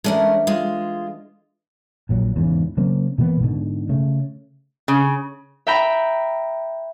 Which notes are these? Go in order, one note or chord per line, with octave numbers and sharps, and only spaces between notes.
E3 G#3 A3 C#4 D4 A#4
G#3 F4
A#1 A#2 F#3
E2 G#2 C#3
C#3 F#3 A#3 C4
B2 E3 A#3 B3
G#2 B2 D3
C#3 A3
C#3
E5 G5 A#5 B5